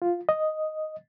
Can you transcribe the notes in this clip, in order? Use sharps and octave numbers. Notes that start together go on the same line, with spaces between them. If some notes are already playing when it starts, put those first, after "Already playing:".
F4
D#5